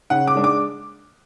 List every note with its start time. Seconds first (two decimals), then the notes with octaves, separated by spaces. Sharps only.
0.10 C#3 F#5
0.27 D6
0.35 G#3 D4
0.44 D6